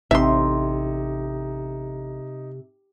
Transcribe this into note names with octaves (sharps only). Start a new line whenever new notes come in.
A1 C3 D#4 E5 C6